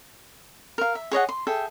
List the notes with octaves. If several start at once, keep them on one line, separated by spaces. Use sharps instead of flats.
A#4 F5
E5
G#4 C#5 D#5 F#5
C6
G#4 A4 E5 G5